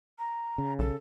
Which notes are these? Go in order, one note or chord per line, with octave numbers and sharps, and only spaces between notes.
A#5
C#3
B1 A4